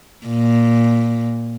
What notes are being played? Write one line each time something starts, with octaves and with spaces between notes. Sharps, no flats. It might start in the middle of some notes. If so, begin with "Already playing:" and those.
A#2